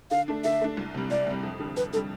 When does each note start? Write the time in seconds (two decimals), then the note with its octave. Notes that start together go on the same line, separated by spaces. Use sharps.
0.11 D3 F5
0.28 A3 D4
0.44 D3 E5
0.61 A3 D4
0.77 C2
0.94 C3 G3
1.11 C2 D5
1.27 C3 G3
1.43 F2
1.60 D3 G3
1.77 F2 B4
1.93 D3 G3 A4